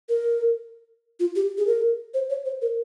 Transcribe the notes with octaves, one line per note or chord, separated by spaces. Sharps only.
A#4
F4
G4
G#4
A#4
C5
C#5
C5
A#4